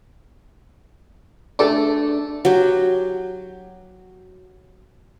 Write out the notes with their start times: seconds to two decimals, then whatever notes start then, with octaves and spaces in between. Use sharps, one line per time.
1.59 A3 D4 A4 D6
2.45 F#3 G4